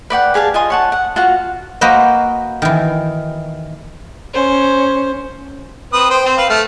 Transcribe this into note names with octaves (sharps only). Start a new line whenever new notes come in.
B4 D5 F#5 G5
G4 G#4 F5 A5
F4 D#5 G#5 C6
C#5 F#5 A5
F#5
F4 F#4 F5 F#5
A#3 F#4 B4 C5 D#5
D#3 E3
C#4 C5
C4 B4 D#6
C5 G5
C4
B4 F5
A3 F6